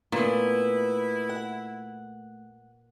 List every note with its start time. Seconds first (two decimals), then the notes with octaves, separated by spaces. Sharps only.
0.12 A#2 A3 B3 E4
1.29 F#5